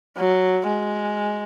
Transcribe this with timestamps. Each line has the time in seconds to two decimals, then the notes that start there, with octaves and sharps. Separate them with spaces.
0.17 F#3
0.67 G#3